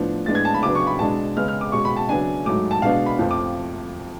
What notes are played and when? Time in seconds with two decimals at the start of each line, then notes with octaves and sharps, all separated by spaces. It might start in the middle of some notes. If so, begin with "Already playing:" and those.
Already playing: A2 F3 B3 D4
0.26 A2 G#3 B3 D4 A6
0.35 G#6
0.45 A5
0.54 B5
0.63 C#3 F#3 B3 D4 D6
0.75 C#6
0.87 B5
0.99 B2 G#3 D4 A5
1.36 C#3 G#3 B3 F6
1.48 F6
1.61 D6
1.72 B2 G#3 C#4 C#6
1.85 B5
1.97 A5
2.09 C#3 F#3 B3 D4 G#5
2.45 G#2 F#3 A3 D6
2.71 A5
2.82 B2 G#3 B3 D4 F5
3.06 B5
3.19 F2 F3 A3
3.31 D6